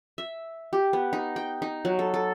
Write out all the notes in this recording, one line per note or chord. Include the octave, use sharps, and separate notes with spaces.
E5
G4
B3
D#4
G5
D#4
F#3
A4
A4